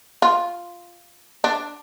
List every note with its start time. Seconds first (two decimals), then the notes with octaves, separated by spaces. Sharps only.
0.22 F4
1.44 D4